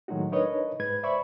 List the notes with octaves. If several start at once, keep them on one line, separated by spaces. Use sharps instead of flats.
A2 D#3 F#3 G#3 D#4 F#4
D4 D#4 A#4 B4 C#5 D#5
G#2 B4 G#6
C5 D5 E5 B5 C#6